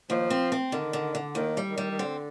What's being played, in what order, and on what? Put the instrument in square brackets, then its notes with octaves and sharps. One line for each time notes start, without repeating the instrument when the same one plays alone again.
[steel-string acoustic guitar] D#2 [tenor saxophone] F3
[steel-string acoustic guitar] C4
C4
[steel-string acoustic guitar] D3 [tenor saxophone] D#3
[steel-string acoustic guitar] D3
D3
[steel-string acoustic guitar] D#2 [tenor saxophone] D#3
[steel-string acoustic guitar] G3
[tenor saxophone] D#3
[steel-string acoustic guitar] G3
[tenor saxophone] D#3
[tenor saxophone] D3 [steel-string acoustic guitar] C4